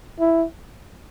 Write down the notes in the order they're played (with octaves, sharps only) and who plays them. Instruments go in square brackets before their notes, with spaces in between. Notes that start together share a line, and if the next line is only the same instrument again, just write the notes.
[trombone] E4